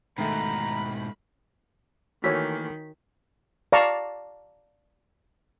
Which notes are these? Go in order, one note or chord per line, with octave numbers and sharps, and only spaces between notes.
G#2 B2 D#3 A3 A#5 B5
D#3 E3 A3 A#3 F#4 C#5 G#5 B6
D5 F5 A5 A#5 C#6